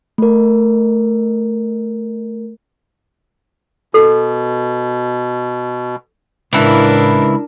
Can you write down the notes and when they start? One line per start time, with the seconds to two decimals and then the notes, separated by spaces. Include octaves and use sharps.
0.18 A3 A#4
3.94 B2 A4
6.53 C#2 A2 E3 D4 E4 A#4